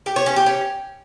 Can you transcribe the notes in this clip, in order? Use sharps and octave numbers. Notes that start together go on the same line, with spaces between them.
G4
C#5
C#4
G4
C#4